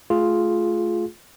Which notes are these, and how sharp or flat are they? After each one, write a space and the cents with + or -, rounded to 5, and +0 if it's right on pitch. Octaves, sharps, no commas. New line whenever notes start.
A3 -15 F4 +0 G#4 +15